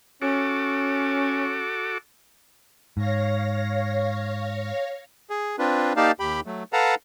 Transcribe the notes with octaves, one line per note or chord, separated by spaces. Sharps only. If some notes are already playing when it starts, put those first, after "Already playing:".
C#4 F#4 A4 D6
G#2 C#5 F5 A#6
G#4
C4 D4 F4 B4
A#3 D#4 G4 D5 F5 A5
D#2 G4 G5 B5
F#3 A3
A4 B4 F5 F#5 A5 A#5